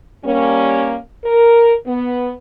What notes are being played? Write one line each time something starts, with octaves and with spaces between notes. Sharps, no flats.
G3 A#3 C#4
A#4
B3